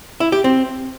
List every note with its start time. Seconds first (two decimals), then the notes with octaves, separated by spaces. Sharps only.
0.20 E4
0.32 G4
0.44 C4